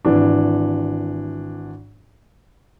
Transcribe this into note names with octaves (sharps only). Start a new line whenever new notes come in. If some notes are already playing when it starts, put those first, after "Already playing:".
G#1 E3 D4